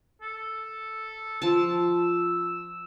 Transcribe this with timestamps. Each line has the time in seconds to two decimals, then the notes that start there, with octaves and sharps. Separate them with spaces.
0.22 A4
1.42 F3 A5 E6